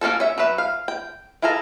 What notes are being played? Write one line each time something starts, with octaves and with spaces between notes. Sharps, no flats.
A#3 C#4 F#4 A4
C#4 E5
F#3 C#4 B4 E5
F5
G5
E4 F4 G#4 A4 A#5